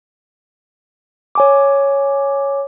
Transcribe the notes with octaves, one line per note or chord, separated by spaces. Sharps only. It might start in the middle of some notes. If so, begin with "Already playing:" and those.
C#5 G#5 D6